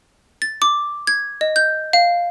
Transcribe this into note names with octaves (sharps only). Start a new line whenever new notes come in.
A6
D6
G#6
D#5
G6
F5